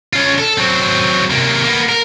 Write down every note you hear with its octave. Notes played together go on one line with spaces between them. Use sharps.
C#4 F4
A4
F#3 C4
C3 A#3
A#3 B3
A#4